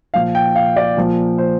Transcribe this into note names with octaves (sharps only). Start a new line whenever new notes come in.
A#2 F3 F5
G5
F5
D5
A#2 F3
C5